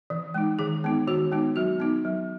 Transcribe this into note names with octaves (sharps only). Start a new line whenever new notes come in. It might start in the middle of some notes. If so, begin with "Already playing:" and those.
E3
G#3 D#4
D#3 G#4
G#3 B3 D#4
D#3 F#4
G#3 B3 D#4
F#3 F#4
B3 D#4
F#3